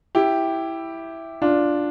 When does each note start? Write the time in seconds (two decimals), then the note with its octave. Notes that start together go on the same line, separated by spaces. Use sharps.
0.15 E4 G4
1.42 D4 F4